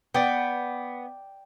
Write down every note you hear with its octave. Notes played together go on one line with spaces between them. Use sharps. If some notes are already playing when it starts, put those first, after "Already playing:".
B3 D5 G5